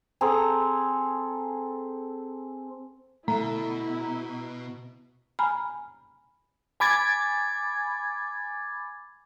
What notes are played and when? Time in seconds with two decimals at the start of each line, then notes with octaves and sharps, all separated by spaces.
0.21 C4 G#4 A4 A#5
3.28 B2 A3 E4 A#5
5.39 G#5 A#5 B5 F6
6.80 G#5 B5 D6 G#6 A6